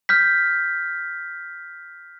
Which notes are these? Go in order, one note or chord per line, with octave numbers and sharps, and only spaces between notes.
F6 G6 B6